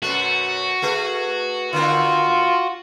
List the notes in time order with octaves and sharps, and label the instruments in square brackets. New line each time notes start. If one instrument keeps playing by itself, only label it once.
[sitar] F#2 B2 A3 [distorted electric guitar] F#4
[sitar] A3 G#4 B4
[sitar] D3 A#3 C4 [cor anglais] F4